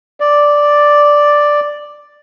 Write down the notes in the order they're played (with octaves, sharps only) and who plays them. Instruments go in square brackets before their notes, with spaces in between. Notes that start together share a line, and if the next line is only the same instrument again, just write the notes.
[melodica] D5